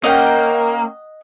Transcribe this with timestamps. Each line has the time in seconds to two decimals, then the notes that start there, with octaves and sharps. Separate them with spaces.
0.03 A#3 C#4 A#4 D#5 F#5 G5